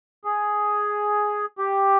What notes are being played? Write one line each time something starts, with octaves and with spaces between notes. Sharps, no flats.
G#4
G4